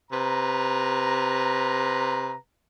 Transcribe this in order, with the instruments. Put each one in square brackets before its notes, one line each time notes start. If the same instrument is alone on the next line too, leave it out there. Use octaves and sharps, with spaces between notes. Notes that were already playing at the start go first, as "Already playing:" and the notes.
[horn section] C3 B4 A#5